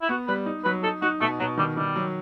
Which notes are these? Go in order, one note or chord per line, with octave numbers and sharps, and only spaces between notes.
E4
B3 F#4
G3 B4
D#4
F#3 B4
D#4 A4
D#4 F#4
B2 A3
B2 F#3
D#3 G3
D#3 G3
F#3